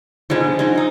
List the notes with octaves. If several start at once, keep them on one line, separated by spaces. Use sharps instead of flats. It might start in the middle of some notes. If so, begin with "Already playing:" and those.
G#2 B2 D3 F3 G#3
F#3 G#3 D#4
F#2 D#4